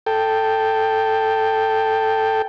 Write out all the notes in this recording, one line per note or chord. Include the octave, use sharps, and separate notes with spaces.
A4 G5